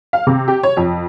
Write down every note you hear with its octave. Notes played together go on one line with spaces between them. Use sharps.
F5
C3
G4
C#5
F2